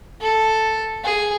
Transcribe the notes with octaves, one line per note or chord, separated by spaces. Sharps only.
A4
G#4